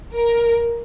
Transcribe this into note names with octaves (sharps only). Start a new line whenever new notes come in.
A#4